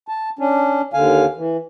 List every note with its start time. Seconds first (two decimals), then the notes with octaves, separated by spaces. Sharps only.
0.08 A5
0.39 C#4 D4
0.94 D#2 D3 F5 G#5
1.36 E3